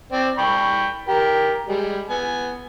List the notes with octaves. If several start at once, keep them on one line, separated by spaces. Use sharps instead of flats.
C4 D5
G5 B5 C#6
G4 A#4
G3 G#3
B3 G#5